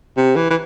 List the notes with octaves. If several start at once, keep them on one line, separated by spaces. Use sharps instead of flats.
C3
E3
E3